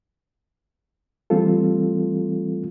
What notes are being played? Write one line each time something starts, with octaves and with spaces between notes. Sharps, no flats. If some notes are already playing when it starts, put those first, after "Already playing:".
E3 G3 A3 C4 F4 A4